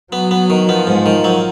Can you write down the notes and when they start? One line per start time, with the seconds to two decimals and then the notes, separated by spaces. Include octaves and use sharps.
0.12 F#3 B3
0.31 B3
0.50 D#3
0.68 F3 B3
0.87 G#2
1.06 D#3
1.24 F#3